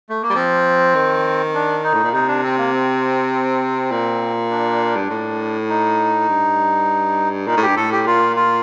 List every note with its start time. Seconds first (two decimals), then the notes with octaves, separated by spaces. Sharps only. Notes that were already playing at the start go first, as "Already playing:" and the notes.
0.10 A3
0.22 A#3
0.30 G3
0.35 F3 C4
0.95 D#3
1.54 D4
1.83 D#4
1.94 A2
2.04 A#2
2.13 C3 D#4
2.28 D4
2.43 C4
2.58 A#3
2.72 C4
3.92 A#2
4.50 D4
4.96 G2
5.10 A2
5.69 D#4
6.28 G2
7.47 A#2 D#4
7.57 A2
7.62 G4
7.67 G2
7.76 A2 A4
7.92 G4
8.06 A#2 F4
8.36 F4